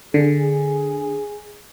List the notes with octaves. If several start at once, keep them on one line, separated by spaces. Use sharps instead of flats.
D3 G#4